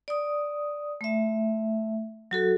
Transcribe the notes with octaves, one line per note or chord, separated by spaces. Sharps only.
D5 D#6
A3 E5
F#3 F#4 A4